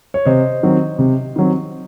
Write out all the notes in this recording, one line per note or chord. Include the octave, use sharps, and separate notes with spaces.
C#5
C3 C5 D#5
D#3 F#3 C4
C3
D#3 F#3 C4